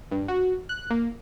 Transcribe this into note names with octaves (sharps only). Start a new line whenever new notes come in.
G2
F#4
F#6
A#3